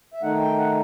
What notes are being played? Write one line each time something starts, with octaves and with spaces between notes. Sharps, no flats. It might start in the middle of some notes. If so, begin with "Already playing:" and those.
E5
D#3 A3 D#4 F#5
G5
F#5